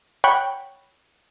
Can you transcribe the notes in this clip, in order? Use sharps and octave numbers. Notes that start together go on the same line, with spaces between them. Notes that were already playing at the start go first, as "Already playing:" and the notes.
C#5 F#5 G5 B5 C#6